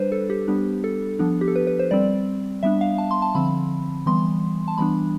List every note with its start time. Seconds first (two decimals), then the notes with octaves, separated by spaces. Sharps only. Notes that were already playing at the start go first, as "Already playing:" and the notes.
Already playing: G3 D4 B4 C5
0.12 A4
0.30 G4
0.48 G3 B3 D4
0.84 A4
1.19 F3 B3 D4
1.41 G4
1.48 A4
1.56 B4
1.67 B4
1.79 C5
1.91 G3 C4 D5
2.63 G3 B3 D4 E5
2.81 F5
2.98 A5
3.11 C6
3.22 A5
3.35 D3 F3 C4 B5
4.06 E3 G3 B3 C6
4.68 A5
4.78 E3 G3 B3 D4 B5